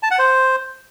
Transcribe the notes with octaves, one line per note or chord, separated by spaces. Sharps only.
A5
F#5
C5